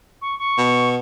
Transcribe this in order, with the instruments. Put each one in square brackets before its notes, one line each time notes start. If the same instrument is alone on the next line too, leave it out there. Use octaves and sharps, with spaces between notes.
[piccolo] C#6
C#6
[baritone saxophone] B2